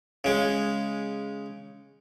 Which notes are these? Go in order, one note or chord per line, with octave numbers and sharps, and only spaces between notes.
C#3 G#3